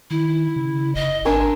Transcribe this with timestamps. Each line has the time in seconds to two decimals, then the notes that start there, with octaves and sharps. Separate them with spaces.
0.10 D#3 E4
0.56 C#3
0.95 F#1 D#5
1.25 G#1 D4 A#4 G#5 E6